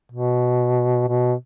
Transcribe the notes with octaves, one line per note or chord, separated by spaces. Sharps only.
B2
B2